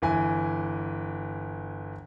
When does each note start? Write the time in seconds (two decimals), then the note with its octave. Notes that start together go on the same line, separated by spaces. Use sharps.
0.02 G1 E3 G#5